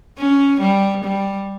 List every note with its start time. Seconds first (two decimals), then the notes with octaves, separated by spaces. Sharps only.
0.19 C#4
0.60 G3
1.05 G3